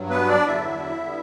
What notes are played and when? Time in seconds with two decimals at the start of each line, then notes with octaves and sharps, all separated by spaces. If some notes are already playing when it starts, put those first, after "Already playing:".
Already playing: G2 F#3
0.10 B3 B4
0.28 D4 D5
0.47 E2 D3 F#3 E4 E5
1.04 D3 G3 B3